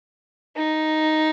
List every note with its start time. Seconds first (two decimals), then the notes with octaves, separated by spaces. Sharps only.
0.57 D#4